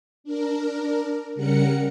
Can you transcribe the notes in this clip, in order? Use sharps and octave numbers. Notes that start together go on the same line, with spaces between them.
D4 A#4
C#3 G3 A#4 F#5 C#7